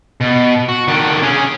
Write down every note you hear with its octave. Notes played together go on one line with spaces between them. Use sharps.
B2
F#4
D#3 D4
C#4 G#4